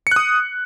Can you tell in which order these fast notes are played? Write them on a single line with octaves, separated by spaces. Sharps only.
C#7 F#6 D#6